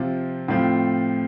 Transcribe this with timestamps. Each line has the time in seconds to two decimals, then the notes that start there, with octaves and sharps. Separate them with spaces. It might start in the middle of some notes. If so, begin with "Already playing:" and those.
Already playing: C3 F3 C4 F4
0.48 A2 F3 C4 F4